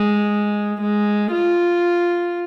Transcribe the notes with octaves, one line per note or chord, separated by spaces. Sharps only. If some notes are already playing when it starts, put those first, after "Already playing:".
Already playing: G#3
G#3
F4